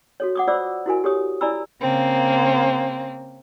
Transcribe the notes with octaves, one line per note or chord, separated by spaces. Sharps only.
F#4 A4 C#5
F#5 D6 D#6
F4 C5 D5 D6 E6
E4 F#4 A#4 G#5
G4 A4 C#5 D#6
E4 D5 G#5 A#5 B5 E6
C#3 A#3 C4